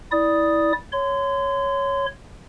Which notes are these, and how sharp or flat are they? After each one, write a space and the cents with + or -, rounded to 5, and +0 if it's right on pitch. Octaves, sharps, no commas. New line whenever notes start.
E4 -20 D5 +0 D#6 +0
C#5 +0 C6 -30